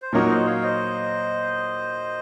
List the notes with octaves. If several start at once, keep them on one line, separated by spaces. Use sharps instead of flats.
C5
A#2 F#3 A#3 D#4 F#4 A#4 C#5
C5 D#5
C#5 F5
C5 D#5